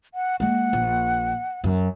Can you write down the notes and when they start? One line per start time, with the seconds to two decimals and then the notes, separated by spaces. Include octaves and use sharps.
0.14 F#5
0.40 G#3 A#3 F#5
0.73 A#1
1.64 F#2